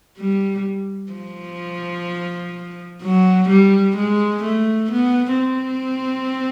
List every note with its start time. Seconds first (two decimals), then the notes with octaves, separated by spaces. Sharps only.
0.18 G3
1.12 F3
3.02 F#3
3.49 G3
3.97 G#3
4.43 A3
4.91 B3
5.38 C4